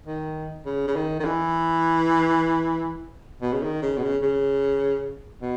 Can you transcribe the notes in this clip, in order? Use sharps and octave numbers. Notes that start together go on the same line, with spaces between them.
D#3
C#3
C#3
D#3
D#3
E3
B2
C#3
D#3
C#3
B2
C#3
C#3
B2